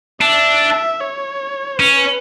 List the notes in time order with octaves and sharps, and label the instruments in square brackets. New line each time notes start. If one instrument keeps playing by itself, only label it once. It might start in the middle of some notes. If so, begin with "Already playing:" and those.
[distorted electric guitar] D4 [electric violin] E5
[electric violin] C#5
[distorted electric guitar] C#4 [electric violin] B4